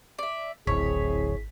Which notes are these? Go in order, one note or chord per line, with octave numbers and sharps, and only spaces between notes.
D5 E5
D1 G#1 C4 E4 G#4 C#5 B6